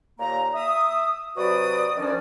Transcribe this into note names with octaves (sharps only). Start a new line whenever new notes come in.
D#2 A#2 A#3 A#5
E5 D#6
C3 F#3 F#4 B4 D5 D#6
D2 D#3 F3 C#4 D4 D5